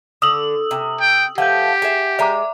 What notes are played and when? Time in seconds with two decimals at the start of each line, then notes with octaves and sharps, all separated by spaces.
0.22 D3 D#6 E6 F#7
0.71 C3
1.01 G5
1.38 F3 A3 G4 B4 F#5 G6
1.82 G#4 E5
2.19 G#3 D5 E5 A#5 D6